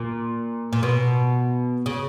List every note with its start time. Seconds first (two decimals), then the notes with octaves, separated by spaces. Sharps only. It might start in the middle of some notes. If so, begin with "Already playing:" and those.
Already playing: A#2
0.73 A#2
0.83 B2
1.86 C#3